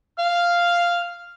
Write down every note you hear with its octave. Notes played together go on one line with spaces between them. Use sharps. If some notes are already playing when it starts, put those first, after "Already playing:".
F5 F6